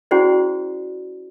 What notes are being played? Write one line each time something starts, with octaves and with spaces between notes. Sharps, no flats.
C#4 E4 F#4 G#4 C5 D5